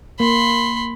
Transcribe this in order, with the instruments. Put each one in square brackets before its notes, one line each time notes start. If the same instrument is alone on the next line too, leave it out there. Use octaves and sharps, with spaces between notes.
[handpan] A#3 [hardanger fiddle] B5 C6